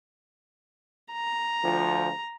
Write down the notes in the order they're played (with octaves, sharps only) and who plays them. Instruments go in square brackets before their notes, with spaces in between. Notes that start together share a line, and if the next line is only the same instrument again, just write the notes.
[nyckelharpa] A#5
[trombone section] D2 F3